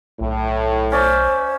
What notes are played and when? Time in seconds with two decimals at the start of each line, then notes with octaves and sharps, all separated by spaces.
0.20 B1 A2
0.92 C#4 C5 D5 E5